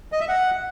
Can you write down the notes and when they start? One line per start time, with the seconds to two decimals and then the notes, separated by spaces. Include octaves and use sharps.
0.12 D#5
0.20 E5
0.28 F#5